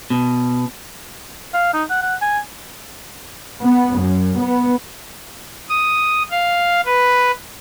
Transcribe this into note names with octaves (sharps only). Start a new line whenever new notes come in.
B2
F5
D#4
F#5
F#5
G#5
B3
F#2
B3
D#6
F5
B4